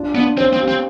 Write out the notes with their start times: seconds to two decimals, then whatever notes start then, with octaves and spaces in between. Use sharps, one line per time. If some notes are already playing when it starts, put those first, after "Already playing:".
Already playing: D4 F4
0.15 B3 D4
0.38 C4 C5
0.53 C4
0.60 G4
0.68 C4